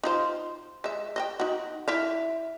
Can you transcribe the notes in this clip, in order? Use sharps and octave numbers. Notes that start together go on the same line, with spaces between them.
D#4 F4 C5
G#3 E5
D#5 E5 G5
D#4 F#4
E4 E5 F5